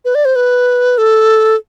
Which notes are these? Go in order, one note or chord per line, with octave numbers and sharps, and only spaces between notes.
B4
D5
C5
B4
A4